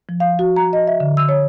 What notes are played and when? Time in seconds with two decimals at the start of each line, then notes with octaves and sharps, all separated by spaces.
0.09 F3
0.20 F5
0.39 F#4
0.56 A#5
0.73 D#5
0.87 E5
1.00 D3
1.17 E6
1.29 C#5